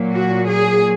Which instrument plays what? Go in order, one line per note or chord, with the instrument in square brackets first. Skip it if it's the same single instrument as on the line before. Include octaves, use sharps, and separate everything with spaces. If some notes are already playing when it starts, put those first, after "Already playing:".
Already playing: [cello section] A#2 F#3
F#4
G#4